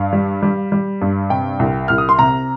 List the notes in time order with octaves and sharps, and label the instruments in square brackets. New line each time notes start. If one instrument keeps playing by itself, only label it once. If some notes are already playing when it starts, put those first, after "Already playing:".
Already playing: [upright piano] G2 F5
G3
G3
G3
G2
C3 G5
C2
C2 F6
D#6
C6
C3 A#5